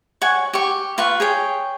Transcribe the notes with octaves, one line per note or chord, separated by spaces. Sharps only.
C#5 F#5 G#5
G4 C#6
F4 B4 F5 C#6
G#4 C#5 G5